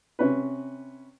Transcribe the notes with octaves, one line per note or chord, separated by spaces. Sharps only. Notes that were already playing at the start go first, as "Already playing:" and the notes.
C3 C#4 B4